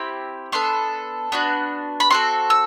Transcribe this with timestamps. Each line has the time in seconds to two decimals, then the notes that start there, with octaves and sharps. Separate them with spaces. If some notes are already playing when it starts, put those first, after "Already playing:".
Already playing: C4 E4 G4 B5
0.52 B3 D4 A4 C6
1.32 B3 D4 F#4
2.00 B5
2.10 C4 F#4 A4 C6
2.50 E6